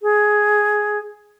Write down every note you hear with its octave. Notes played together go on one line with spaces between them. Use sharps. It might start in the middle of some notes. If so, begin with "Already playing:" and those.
G#4